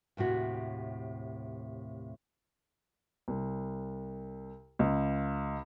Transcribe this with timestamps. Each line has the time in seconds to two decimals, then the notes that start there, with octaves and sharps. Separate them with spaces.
0.17 D#2 A2 C3 F#4
3.28 C2
4.79 C#2